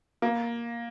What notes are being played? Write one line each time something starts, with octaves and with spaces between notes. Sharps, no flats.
A#3